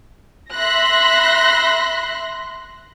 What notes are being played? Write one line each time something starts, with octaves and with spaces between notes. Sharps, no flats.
E5 B5 C6 F#6 A#6